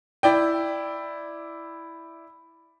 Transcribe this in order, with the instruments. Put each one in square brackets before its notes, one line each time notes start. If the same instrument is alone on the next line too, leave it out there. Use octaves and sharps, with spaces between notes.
[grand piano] E4 D5 G5